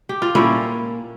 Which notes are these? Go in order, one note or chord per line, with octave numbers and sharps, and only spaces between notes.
G4
F4
A#2 G3 A#3 C#4 E4